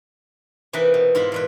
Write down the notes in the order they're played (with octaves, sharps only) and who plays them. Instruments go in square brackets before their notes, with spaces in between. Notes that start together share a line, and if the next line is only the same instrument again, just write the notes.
[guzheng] C3 E3 A#3 D#4 B4 E5
B2
G#2 E4 F4 B5
E2 A#2 B4